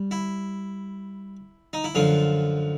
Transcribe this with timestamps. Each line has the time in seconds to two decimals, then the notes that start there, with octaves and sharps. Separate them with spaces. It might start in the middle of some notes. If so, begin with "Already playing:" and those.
Already playing: G3
0.11 E4
1.73 D#4
1.84 E4
1.95 F#2 D3 F3 F4